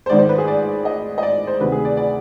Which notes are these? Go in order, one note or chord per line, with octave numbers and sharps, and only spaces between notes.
C5
G#1 G#2 D#3 D5
C5
B4
G#4
D5
D#5
D#5
D5
C5
D2 C3 D#3 B4
G#4
D5
D5